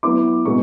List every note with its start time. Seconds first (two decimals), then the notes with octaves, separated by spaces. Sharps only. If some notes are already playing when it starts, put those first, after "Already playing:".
0.03 F#3 B3 E4 D6
0.45 B2 G#3 B3 C#6